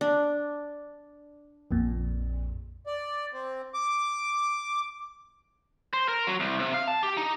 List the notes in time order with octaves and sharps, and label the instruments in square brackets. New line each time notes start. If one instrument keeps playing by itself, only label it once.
[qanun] D4
[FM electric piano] A#1 F2 A#2
[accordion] D5
C4
D6
[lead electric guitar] C5
A#4
F#3
C2
C3
F5
A5
G4
D#4